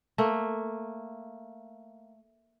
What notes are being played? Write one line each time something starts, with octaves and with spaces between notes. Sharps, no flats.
A3 A#3